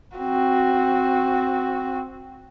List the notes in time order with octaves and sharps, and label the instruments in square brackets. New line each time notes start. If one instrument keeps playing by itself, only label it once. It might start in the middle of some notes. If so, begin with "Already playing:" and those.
[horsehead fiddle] C4 F#4